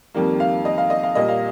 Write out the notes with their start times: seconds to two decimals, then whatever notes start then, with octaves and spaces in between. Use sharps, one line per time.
0.14 F2 D#3 G3 A#3
0.40 F5
0.65 D#5
0.78 F5
0.90 D#5
1.03 F5
1.15 A#2 G3 A#3 D#5
1.28 F5